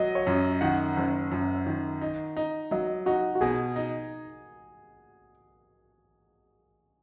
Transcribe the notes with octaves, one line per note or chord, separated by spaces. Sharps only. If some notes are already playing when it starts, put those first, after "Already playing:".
Already playing: F#3 D#5
C#5
F#2
D#3 F#5
F#1
F#2
D#3
D#4
D#4
F#3 D#5
D#4 F#4
F#4
B2 G#4
D#4